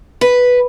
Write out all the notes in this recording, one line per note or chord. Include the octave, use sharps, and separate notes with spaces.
B4